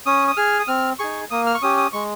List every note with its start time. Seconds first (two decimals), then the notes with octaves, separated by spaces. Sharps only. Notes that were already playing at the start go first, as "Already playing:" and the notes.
0.06 C#4 D#6
0.28 D#6
0.37 G#4 F6
0.60 D#6
0.68 C4 F6
0.99 D#4 G#4 C#6
1.30 A#3 D#6
1.46 F6
1.55 C#6
1.62 C#4 G4 D#6
1.77 D#6
1.93 G#3 C#6